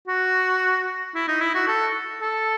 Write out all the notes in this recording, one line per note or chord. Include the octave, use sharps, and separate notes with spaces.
F#4
E4
D#4
E4
F#4
A4
A4